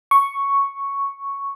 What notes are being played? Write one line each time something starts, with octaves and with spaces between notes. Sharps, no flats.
C#6